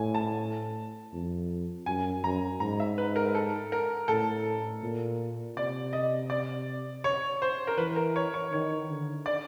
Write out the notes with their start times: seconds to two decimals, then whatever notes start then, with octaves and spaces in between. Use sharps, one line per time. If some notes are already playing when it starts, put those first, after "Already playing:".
Already playing: A2 G#5
0.15 A5
1.13 F2
1.86 F#2 G#5
2.24 F#2 A#5
2.60 G#2 A#5
2.80 E5
2.98 B4
3.16 A#4
3.35 A4
3.72 A#4
4.08 A2 A4
4.83 A#2
5.57 C3 D5
5.93 D#5
6.30 D5
7.04 C#5
7.42 C5
7.67 A#4
7.78 E3 B4
7.96 A#4
8.16 C#5
8.34 C#5
8.52 D#3 C#5
8.89 D3
9.26 D5